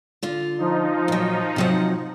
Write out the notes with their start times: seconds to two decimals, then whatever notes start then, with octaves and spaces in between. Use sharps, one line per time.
0.23 D3 F4
0.59 F3 D#4
1.08 A#2 F#3
1.56 C3 F#3 F#5